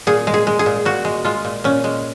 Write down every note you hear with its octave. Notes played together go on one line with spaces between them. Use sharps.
A#2 G#4
G#3
G#4
G#3
G#4
A#2
A#2 F#4
G#3
G#3 F4
A#2
A#2 C#4
G#3